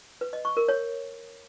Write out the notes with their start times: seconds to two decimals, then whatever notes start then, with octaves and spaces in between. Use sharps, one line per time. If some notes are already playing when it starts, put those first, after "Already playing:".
0.21 B4
0.33 D#5
0.45 C#6
0.57 A#4
0.68 C#5